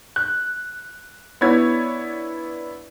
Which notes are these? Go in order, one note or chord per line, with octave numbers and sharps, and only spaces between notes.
F#6
B3 D4 E4 C#5 G#6